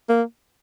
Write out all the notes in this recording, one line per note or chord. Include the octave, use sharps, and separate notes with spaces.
A#3